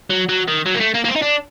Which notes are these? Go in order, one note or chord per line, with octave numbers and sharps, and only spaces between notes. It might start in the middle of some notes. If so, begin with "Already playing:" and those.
F#3
F#3
D#3
F#3
A#3
A3
A#3
A#3
C4
D#4
D4